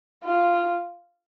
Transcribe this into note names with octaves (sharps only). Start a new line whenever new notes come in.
F4